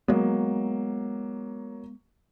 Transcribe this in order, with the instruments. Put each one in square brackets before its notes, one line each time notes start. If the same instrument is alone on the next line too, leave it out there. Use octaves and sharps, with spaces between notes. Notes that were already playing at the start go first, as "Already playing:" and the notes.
[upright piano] F#3 A#3 [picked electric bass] G#3 B3